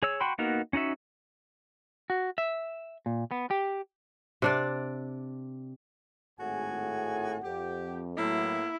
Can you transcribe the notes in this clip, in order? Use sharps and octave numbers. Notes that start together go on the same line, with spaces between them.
G#4 C#5 E6
F#4 G5 B5 C6
A#3 B3 D#4 F#4 A#4
C#4 D#4 F#4 E5
F#4
E5
A#2
B3
G4
C3 D4 D5
G#1 A2 F#4 G#4 F#5 G#5
F2 G4
A2 F#3 A#3 B3 E4